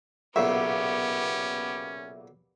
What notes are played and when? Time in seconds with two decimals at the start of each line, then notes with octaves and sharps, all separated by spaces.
0.36 B1 A#2 C#3 B3 C#4 G4 E5